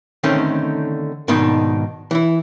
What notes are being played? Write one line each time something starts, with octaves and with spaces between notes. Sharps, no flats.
D3 D#3 A3 C4 C#4 D#4
G#2 B2 D#3 D4 D#4
E3 E4